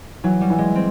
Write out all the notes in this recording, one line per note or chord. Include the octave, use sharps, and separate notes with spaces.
E3 F#3
G3
E3
G#3
C4